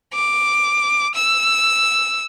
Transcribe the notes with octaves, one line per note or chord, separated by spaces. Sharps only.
D6
E6